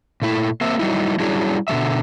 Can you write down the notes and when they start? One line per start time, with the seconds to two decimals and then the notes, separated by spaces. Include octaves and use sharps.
0.22 A#2 A3 E4
0.61 A#3 C4 E5
0.79 F#3 G3 D#4 E4
1.20 F#3 G3 C#4 D4 E4 G#4
1.68 B2 D3 G3 E5